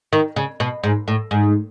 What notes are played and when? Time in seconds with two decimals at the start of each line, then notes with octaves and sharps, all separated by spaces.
0.13 D#3
0.36 C#3
0.60 B2
0.84 G#2
1.08 A2
1.31 G#2